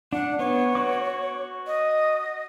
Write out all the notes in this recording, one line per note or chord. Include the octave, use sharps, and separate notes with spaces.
D4 F#5
B3 C#5
F#4 C#6 D6
D#5